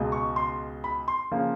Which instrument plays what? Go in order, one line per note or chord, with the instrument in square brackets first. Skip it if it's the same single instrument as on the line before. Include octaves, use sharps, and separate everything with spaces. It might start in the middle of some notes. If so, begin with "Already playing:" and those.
Already playing: [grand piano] C#2 B2 G#3
C#6
C6
B5
C6
C#3 F3 A#3